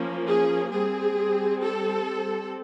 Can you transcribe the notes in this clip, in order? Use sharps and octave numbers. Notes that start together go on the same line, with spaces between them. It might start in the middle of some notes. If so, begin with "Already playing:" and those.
Already playing: F3 A#3 C#4
G#4
G3 C4 G#4
A4